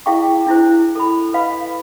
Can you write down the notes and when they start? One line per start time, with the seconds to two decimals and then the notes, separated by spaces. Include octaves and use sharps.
0.06 E4 G#4 F5 G5 C#6
0.47 D4 E4 C5
0.95 A4 B5
1.33 B4 F5 B5